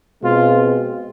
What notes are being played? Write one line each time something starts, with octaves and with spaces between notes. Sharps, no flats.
B2 G#3 C4 F4